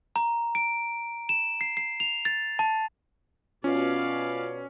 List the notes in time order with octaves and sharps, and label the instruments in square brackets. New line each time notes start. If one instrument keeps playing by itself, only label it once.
[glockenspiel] A#5
D7
E7
C7
C7
F7
A6
A5
[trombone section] B2 [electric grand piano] C#4 [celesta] F4 [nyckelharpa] D5 F5